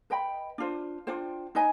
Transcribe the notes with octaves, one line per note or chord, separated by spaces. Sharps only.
B4 D#5 G5 B5
D4 F4 C5
D4 F4 C5 G5
D#4 B4 D#5 G#5